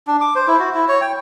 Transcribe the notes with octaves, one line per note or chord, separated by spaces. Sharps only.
D4
D6
C5
E4
F#4
E4
C#5
G5